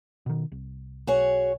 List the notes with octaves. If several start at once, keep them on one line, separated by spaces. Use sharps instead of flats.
B2 D#3
C2
B1 F#4 G#4 C#5